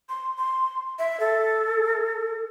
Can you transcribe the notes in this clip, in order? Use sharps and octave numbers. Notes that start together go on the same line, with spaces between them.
C6
C6
E5
A4